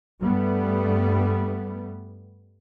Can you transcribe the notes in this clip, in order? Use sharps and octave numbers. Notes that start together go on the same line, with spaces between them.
G2 G3 A3 B3